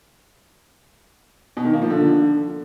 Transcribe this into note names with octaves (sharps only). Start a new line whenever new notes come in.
B2
D#3
A#3
F3
D3